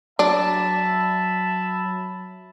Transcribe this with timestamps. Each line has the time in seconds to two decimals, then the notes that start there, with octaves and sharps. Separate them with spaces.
0.19 F#3 D4 E5 A5 B5